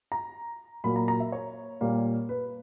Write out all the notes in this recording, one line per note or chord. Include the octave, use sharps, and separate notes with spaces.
A#5
A#2 F#3 A#3 B5
A#5
A#5
E5
C#5
A#2 G3 A#3
B4